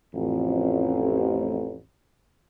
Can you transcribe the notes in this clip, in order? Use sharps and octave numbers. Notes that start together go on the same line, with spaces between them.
A1 F2